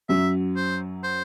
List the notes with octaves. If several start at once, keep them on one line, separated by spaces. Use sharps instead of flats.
F#2 F#3 E5
C5
C5